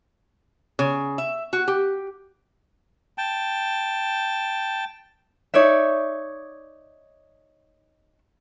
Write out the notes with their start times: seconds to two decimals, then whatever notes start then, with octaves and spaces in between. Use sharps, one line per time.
0.79 C#3
1.18 E5
1.53 F#4
1.68 G4
3.18 G5 A5
5.54 D#4 C#5 D5 E5